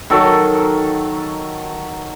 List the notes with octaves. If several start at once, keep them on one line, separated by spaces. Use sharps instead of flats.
D#3 F#3 A4 C#6